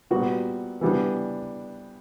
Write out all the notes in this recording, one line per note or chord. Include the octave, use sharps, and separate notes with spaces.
A#2 G3 B3 F#4
E3 G3 B3 D4